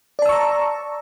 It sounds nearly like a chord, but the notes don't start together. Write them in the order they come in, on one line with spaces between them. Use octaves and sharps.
D5 A5 E6 C#6 A#5